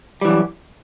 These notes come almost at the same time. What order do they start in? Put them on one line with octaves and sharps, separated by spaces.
G3 E3 F#2